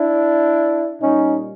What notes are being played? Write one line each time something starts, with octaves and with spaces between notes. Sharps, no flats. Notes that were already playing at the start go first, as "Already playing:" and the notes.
Already playing: D4 E4
A#2 G3 C#4 D#4